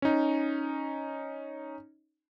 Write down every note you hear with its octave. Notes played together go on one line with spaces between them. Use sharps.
C#4 D#4